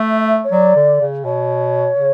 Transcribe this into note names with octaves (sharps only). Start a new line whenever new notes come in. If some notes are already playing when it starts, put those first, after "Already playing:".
Already playing: A3 E5
C#5
F#3 D5
D3
C#3
B2 C#5
C#3